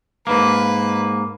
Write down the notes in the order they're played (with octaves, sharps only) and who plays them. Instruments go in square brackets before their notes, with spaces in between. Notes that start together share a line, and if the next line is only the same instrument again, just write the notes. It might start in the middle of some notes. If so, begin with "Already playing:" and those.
[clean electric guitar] G#2 A#3 [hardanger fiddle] B4